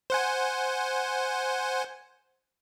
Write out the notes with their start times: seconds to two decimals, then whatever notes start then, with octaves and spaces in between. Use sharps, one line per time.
0.10 C5 F#5 G#5